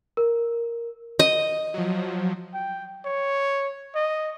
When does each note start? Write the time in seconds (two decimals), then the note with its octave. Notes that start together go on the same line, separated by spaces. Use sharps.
0.17 A#4
1.19 D#5
1.74 F3 F#3
2.54 G5
3.05 C#5
3.95 D#5